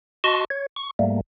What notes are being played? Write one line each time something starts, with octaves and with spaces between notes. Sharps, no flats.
F#4 D#5 A5 C6 C#6
C#5
C#6
G#2 G3 A3 A#3